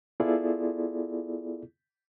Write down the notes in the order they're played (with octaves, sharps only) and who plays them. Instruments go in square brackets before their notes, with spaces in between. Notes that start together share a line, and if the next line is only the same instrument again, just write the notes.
[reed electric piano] B3 E4 F4 G#4 A4 D5